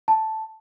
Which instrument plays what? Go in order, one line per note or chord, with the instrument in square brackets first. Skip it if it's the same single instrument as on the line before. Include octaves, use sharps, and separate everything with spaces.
[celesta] A5